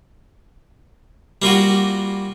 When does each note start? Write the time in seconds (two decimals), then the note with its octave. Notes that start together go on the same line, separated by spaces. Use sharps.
1.42 G3 A#3 F4 F#4